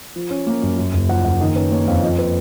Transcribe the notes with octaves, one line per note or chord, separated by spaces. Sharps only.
F3
C#4
A#3
F#2
F#2
F#1
F3 F#5
F#1 F#5
D#3 D#5
C#4 B4
A#3 C#5
F2 F5
F3 D#5
B4